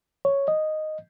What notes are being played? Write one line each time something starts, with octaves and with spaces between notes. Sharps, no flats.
C#5
D#5